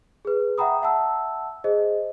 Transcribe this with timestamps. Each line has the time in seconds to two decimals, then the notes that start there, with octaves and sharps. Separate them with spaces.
0.25 G#4 B4
0.58 E5 F#5 G5 A#5 B5 D#6
0.82 E5 F#5 A5 E6
1.64 G#4 C5 D#5